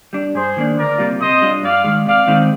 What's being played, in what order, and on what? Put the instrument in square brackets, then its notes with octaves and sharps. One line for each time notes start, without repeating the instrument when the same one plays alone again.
[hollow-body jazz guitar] G3 D4
[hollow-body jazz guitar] G2 [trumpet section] G#4 C5
[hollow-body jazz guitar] D#3 A#3 D4
[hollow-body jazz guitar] D2 [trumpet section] A#4 D5
[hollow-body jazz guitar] C3 G3 A#3 F4
[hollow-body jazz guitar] C3 [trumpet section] C5 D#5
[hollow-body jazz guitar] G3 D4 F4
[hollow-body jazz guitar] G2 [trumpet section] D5 F5
[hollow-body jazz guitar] D#3 G#3
[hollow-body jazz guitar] C3 [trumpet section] D5 F5
[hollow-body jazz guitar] D#3 G#3 C4 D#4